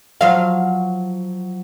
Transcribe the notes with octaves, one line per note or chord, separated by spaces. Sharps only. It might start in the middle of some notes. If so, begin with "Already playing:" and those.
F3 F#3 F5